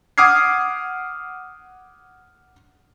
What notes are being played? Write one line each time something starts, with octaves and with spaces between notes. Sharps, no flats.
F#5 D6 D#6 F6 G#6 C7